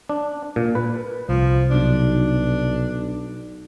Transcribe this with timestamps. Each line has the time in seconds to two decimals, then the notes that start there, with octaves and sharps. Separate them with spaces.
0.09 D4
0.56 A#2
0.75 B4
1.29 C2 F3
1.70 B1 D4